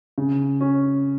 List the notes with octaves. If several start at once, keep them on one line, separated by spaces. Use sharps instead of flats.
C#3
C#4